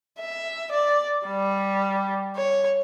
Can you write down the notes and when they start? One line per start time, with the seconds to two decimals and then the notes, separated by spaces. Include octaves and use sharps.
0.19 E5
0.72 D5
1.27 G3
2.36 C#5